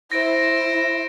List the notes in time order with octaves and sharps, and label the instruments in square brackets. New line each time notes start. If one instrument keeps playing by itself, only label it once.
[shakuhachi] E4 [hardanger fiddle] C5 [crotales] A#6 D7